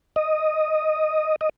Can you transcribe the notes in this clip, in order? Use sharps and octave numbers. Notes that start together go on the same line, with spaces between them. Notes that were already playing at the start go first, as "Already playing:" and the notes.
D#5
D#5